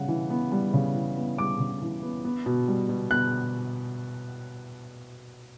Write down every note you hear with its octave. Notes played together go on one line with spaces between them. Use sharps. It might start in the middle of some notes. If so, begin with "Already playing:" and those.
Already playing: C#3 G3 B3 F#5
E3
B3
G3
C#3
E3
B3
G3 D6
C#3
E3
B3
B3
B2
G3
B2
B3 F#6